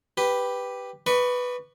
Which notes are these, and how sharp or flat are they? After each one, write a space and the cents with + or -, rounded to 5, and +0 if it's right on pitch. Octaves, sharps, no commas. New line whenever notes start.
G4 +0 B4 +0
B4 +0 D5 +45 C#6 +15